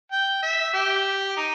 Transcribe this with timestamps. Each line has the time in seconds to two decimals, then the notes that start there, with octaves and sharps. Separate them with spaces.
0.12 G5
0.42 E5
0.73 G4
1.37 D#4